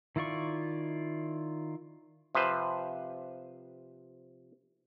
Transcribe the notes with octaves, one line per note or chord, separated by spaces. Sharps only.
D#3 E4 F4 D5 C#6
C3 F3 B4 C5